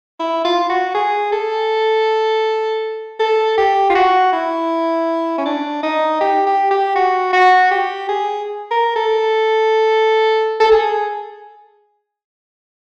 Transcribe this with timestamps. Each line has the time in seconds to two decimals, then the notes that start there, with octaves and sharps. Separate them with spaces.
0.19 E4
0.45 F4
0.70 F#4
0.94 G#4
1.32 A4
3.20 A4
3.58 G4
3.90 F4
3.95 F#4
4.33 E4
5.38 C#4
5.45 D4
5.83 D#4
6.21 G4
6.46 G4
6.71 G4
6.96 F#4
7.33 F#4
7.71 G4
8.09 G#4
8.71 A#4
8.96 A4
10.60 A4
10.72 G#4